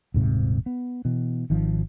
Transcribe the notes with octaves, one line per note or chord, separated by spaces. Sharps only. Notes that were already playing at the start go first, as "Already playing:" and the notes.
D#1 G#2 C3
B3
B2 E3
G#1 D#3 F3